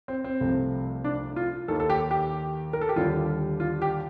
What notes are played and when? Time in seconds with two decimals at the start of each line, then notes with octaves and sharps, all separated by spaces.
0.08 C4
0.24 C4
0.41 C2 C3 F3 A3
1.04 D4
1.36 F4
1.68 D#2 D#3 A#3 A4
1.80 A4
1.90 G4
2.11 G4
2.73 A#4
2.81 A4
2.89 G4
2.96 D#2 D3 G3 F4
3.60 F4
3.82 G4